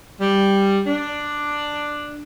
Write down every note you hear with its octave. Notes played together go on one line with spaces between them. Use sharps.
G3
D4